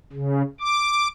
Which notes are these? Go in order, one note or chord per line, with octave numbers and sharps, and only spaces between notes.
C#3
D6